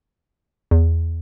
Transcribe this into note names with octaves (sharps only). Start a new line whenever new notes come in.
E2